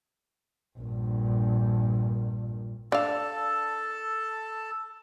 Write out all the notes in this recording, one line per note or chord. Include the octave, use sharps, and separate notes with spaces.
A#1 G2
D4 A4 F5 A5